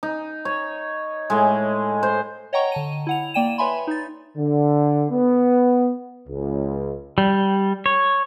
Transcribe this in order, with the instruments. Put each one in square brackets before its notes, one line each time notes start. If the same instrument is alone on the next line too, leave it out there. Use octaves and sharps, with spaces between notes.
[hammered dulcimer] D#4
C#5
A2 G#3
C5
[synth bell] C#5 D#5 F#5 G5 A#5 C#6
D3 A5 D#7
E4 F#5 F7
A#3 D5 G5 D#7 E7
B4 C#5 E5 G#5 B5 C6
D#4 A6
[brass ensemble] D3
B3
C#2
[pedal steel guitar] G3
C#5